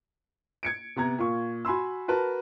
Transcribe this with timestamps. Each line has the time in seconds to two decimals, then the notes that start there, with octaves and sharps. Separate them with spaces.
0.63 G#6 C#7 D7
0.96 C3 B3 A#5 G#6
1.19 A#2 F4 C#6
1.65 F#4 G#5 B5 C6 E6
2.08 F#4 A#4 B4 A5